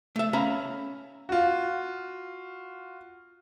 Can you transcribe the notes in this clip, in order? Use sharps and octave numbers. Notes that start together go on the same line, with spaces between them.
A3 E5
C#4 E5 F5 A#5 B5
F4 F#4